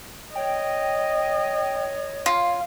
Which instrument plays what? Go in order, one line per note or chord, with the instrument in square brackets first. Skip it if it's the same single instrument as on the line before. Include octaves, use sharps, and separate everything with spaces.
[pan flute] C#5 [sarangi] D#5 [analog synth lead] G5
[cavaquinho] F4 [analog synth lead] F5